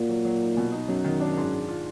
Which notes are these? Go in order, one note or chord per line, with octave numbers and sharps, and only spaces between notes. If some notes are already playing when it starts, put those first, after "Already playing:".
Already playing: A#2 A#3 F#4
F#3
F#3
D#4
B2
D#4
F#2 F#3
D#3
D4
G#2
G#2
F4